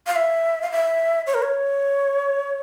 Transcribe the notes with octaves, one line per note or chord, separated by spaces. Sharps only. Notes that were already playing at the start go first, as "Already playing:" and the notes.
F5
E5
F5
E5
C#5
A#4
C#5